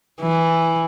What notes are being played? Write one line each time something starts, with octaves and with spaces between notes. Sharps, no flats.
E3